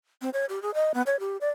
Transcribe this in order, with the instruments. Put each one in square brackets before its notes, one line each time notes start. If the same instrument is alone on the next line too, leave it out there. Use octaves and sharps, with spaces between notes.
[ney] C4
C#5
G4
G#4
D#5
B3
C#5
G4
D5